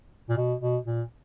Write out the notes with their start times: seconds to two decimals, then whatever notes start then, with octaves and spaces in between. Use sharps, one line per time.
0.29 A#2
0.37 B2
0.60 B2
0.85 A#2